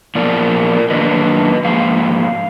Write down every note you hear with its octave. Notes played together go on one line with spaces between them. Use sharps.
A#2 F3 B3 A#4 D5
F#2 D#3 A#3 D4 B4 D#5
G#2 F3 A#3 F5